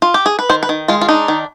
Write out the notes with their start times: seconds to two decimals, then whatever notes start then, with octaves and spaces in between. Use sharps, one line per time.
0.02 F4
0.14 G4
0.26 G#4
0.39 B4
0.49 D#3 C5
0.63 B4
0.69 D#3
0.88 G#3 F4
1.01 F4
1.09 D4 D#4
1.28 D#3